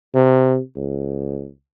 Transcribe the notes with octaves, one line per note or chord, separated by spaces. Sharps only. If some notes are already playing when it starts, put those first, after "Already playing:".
C3
C#2